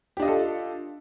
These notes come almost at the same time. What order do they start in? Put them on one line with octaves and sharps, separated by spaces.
G4 D4 D#5 F4 A4